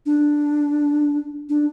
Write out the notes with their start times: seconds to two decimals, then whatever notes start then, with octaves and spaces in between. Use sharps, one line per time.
0.06 D4
1.49 D4